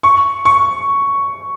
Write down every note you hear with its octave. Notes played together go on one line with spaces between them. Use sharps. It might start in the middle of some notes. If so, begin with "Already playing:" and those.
C#6
C#6